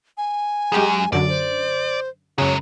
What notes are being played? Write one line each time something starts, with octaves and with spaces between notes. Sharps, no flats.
G#5
F#2 G#3 G4 G#4
F#2 D3 F#4 D5
C5
F#2 C#3 F#3 G#3 C#5